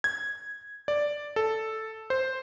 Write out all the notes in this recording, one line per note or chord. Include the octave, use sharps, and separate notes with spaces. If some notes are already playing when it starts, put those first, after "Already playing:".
G#6
D5
A4
C5